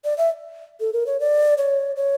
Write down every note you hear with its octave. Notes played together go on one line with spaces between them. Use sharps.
D5
E5
A4
A#4
C#5
D5
C#5
C#5